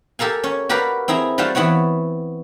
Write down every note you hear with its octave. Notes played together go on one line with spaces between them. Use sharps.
G4 A4 A#4 F5 G#5
C#4 C#5
F#4 G4 A#4 B4 D5 F5
C4 E4 G#4 A#5
G3 F4 F#4 C5 F5 A5
E3 B3 C4 F#4 C#5